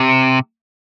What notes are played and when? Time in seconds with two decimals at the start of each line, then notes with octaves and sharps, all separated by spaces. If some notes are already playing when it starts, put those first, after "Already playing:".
Already playing: C3